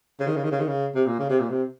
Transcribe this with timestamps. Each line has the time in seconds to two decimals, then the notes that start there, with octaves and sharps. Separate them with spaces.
0.20 C#3
0.27 D#3
0.36 C#3
0.44 D#3
0.51 C#3
0.60 D#3
0.67 C#3
0.95 C3
1.07 A#2
1.19 C#3
1.30 C3
1.40 A#2
1.49 C3